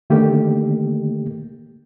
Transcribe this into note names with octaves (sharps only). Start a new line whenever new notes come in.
D3 D#3 A3 A#3 G4